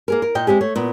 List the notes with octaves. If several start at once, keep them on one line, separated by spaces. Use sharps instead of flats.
A#3 G#4 A#4
A#4
A#2 D#5 G5
G#3 C4 G4 G#4
A3 C#5
A#2 B3